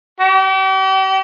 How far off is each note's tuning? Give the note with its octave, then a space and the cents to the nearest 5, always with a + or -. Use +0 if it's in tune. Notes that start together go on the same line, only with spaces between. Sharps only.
G4 -40